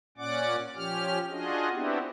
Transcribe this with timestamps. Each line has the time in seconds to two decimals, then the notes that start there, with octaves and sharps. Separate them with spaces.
0.18 A#2 C#4 D5 F#5 D6
0.76 F3 C#4 G4 F6
1.30 D4 F4 F#4 G#4 D#5
1.72 B3 C4 D4 E4 F#4 G4